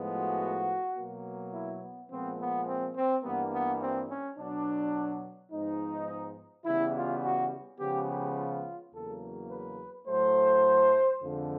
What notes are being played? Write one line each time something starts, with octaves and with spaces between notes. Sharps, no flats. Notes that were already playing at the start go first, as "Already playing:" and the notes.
Already playing: A2 F3 G#3 B3
F#4
B2 F#3 A#3
E4
B3
A#2 F3 G#3 B3 C4
B3
C4
C4
G2 E3 G3 A#3 B3
B3
C4
C#4
B2 F#3 B3 D4
G#2 F3 G#3 B3 D#4
C#3 E3 G3 B3 E4
F4
F#4
C#3 F3 G#3 B3 G4
G4
F4
E2 C#3 F#3 A#3 A4
B4
A2 F#3 A3 C5
F2 D3 F3 G#3